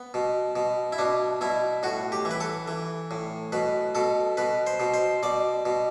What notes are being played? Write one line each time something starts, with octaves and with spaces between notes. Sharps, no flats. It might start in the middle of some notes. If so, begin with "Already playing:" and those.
Already playing: B3
B2
B2
E4
B2 D4
B2 E4
A2 F#4
G4
E3
B4
A4
E3
A2
B2 B4
B2 A4
B2 B4
C5
B2
C5
B2 D5
B2